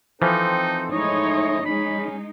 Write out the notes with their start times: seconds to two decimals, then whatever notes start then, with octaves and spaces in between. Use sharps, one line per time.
0.22 E3 F3 C4 D#4 A4 C5
0.91 G#3 A3 D#4 E4 C#5 D#5
1.65 G#3 C#4 D#4 B5